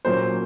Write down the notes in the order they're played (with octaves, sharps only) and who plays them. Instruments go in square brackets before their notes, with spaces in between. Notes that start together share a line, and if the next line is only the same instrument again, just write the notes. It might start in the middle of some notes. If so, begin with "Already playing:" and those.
[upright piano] A#2 F#3 A#3 C#4 C5